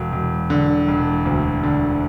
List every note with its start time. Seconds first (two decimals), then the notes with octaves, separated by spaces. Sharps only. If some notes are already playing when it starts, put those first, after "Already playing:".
Already playing: E1
0.12 E1
0.50 D3
0.88 E1
1.25 D2
1.63 D3